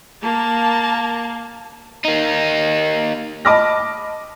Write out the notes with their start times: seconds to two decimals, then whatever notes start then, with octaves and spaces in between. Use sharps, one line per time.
0.23 A#3 A5
2.05 A#3 D#4
3.45 D#5 A5 B5 D6 F6 A#6